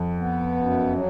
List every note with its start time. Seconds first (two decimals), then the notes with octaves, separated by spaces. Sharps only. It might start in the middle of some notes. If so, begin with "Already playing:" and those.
Already playing: F2
0.18 B3
0.56 F#2
0.94 F#3